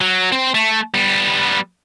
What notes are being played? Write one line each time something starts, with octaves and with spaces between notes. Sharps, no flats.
F#3
C4
A3
G3 B3